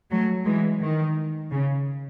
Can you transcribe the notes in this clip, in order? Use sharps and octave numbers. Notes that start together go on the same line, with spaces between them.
F#3 A3
E3 G#3
D#3
C#3